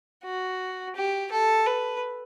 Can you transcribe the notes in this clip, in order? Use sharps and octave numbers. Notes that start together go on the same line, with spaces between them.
F#4
G4
A4
B4